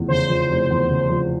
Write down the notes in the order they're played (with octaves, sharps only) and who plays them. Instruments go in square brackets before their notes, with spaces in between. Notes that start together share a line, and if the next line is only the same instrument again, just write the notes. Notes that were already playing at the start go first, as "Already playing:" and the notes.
Already playing: [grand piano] F1 E2 F3
[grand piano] C#3 [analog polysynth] C5
[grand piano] F3
F1
E2
C#3
F3